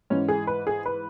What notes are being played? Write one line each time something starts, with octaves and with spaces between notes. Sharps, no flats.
G#2 E3 C#4
G#4
B4
G#4
B4